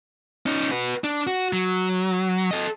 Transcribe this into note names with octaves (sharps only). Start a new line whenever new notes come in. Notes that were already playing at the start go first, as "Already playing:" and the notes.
C#4 D#4
F#4 B4
D4
F#4
F#3
A4 D#5